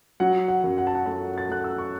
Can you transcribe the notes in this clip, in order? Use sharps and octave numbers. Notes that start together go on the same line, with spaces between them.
F#3 F#5
F#5
F#2
F#5
A5
F#5
A3 A5
A6
A3 F#6
E6
C#6